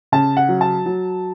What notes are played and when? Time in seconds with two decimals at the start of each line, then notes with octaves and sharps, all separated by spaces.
0.12 C#3 A5
0.37 F#5
0.49 F#3
0.61 A5
0.86 F#3